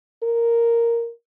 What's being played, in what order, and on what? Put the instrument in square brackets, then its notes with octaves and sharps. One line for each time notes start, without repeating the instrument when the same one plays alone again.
[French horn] A#4